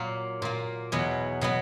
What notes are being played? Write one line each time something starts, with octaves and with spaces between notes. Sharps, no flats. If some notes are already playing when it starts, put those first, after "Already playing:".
Already playing: A#2 F#3 A#3 C#5
A#2 A#3
E2 B2 F#3 B3
B2 F#3 B3